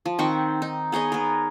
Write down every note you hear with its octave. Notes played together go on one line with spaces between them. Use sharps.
F3
D#3 C4 F#5 C#6
D#4
B3 G#4 C#5 D#5
B3 A#4